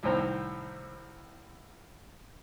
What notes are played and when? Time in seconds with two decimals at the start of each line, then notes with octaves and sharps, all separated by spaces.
0.03 C2 A2 D#3 C5 A#5